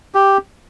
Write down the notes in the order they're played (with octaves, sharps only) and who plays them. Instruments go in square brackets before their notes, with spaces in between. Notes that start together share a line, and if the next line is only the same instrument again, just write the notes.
[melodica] G4